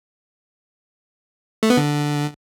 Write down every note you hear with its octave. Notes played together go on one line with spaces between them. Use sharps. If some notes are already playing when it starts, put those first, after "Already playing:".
A3
B3
D3